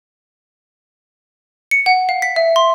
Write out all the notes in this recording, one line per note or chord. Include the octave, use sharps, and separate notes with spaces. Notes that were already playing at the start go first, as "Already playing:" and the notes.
C#7
F#5
F5
B6
E5
C6